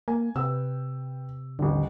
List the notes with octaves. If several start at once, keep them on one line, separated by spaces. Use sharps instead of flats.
A#3 G#5
C3 B4 G5 E6
D#1 A1 D3